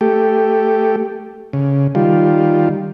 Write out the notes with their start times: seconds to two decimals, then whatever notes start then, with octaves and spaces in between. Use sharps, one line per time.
0.01 A3 G4
1.53 C#3
1.95 D#3 G3 F4